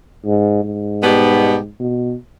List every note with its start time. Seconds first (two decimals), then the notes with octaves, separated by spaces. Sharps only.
0.25 G#2
0.64 G#2
1.02 B2 G3 B3 D#4 G4
1.80 B2